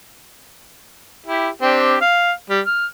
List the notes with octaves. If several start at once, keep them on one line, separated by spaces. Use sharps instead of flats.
E4 G4
C4 D4 G4
F5
G3
F6